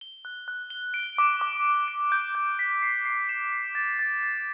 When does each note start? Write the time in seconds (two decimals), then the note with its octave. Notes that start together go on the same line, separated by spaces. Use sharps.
0.01 G7
0.25 F#6
0.48 F#6
0.70 G7
0.94 D7
1.18 D6
1.41 D6
1.65 D7
1.88 D7
2.12 G6
2.35 G6
2.59 B6
2.82 C7
3.05 C7
3.29 E7
3.52 C7
3.75 A6
3.99 A6
4.23 A6